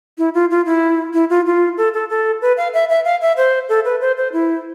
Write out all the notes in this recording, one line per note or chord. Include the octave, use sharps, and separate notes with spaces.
E4
F4
F4
E4
E4
F4
F4
A4
A4
A4
B4
F5
E5
E5
F5
E5
C5
A4
B4
C5
C5
E4